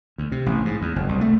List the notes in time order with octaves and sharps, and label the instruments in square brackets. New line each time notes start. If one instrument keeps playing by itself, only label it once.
[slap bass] D2
C3
A1
G#2
E2
F#1
C2
A3